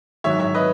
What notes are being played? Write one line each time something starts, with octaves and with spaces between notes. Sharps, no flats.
G#2 F#3 C#5 E5
C#5 E5
B4 D#5